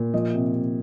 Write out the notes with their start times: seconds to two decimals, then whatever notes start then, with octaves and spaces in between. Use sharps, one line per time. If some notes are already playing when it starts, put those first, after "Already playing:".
Already playing: A#2
0.14 F3 D#5
0.34 C3
0.54 C3